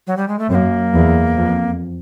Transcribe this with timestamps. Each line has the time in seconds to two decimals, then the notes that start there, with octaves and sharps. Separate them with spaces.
0.07 F#3
0.17 G3
0.28 G#3
0.39 A3
0.50 F#2 C4
0.55 A#3
0.94 E2
1.36 F2